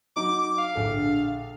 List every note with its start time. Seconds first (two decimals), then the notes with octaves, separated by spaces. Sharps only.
0.16 F#3 D#4 D6
0.39 D6
0.58 F5
0.75 A#1 D3 A4